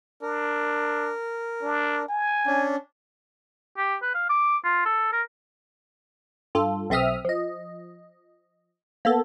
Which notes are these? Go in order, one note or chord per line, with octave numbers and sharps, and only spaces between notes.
D4 A#4
D4
G#5
C#4 D4
G4
B4
F5
D6
F4
A4
A#4
G2 F4 A4
B1 C4 E5 D#6 F6
F3 D#5
A#3 B3 A4